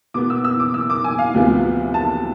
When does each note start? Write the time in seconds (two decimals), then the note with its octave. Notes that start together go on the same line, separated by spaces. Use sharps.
0.14 B2 B3 D6
0.30 E6
0.44 E6
0.60 D6
0.74 E6
0.90 D6
1.04 G#5
1.19 F5
1.34 D2 C3 F3 B3
1.94 A5